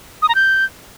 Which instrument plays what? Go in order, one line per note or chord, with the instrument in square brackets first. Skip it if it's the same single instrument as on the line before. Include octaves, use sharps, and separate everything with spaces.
[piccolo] D#6
A#5
G6